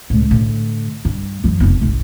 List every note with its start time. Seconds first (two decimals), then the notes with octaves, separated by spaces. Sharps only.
0.10 C#2 A2
0.31 A2 D3
1.05 G2
1.44 F#2 E3
1.60 F1 B3
1.81 G1 C2